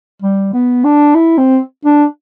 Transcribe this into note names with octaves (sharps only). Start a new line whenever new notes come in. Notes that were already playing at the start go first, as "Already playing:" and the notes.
G3
B3
D4
E4
C4
D4